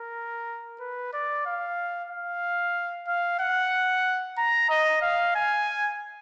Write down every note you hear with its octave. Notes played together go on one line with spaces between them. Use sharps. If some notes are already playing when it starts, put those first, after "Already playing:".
Already playing: A#4
B4
D5
F5
F5
F5
F#5
A#5
D#5
F5
G#5